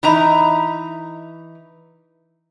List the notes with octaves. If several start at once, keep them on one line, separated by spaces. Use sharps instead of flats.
E3 D#4 E5 A#5